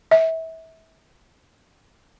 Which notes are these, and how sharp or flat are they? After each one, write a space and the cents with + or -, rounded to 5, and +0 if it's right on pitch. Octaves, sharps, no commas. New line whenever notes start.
E5 -30